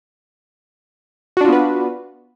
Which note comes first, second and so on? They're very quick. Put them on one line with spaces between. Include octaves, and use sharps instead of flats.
F#4 D4 F4 B3 B4